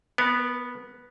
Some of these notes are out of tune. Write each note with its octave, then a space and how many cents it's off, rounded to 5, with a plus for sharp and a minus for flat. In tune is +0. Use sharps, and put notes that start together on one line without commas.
B3 -5 A#4 +30